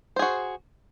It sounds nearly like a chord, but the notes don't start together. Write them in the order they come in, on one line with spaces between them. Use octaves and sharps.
C5 G#4 F#4